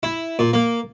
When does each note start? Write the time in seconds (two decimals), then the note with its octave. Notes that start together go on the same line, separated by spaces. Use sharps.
0.03 E4
0.39 A#2
0.53 A#3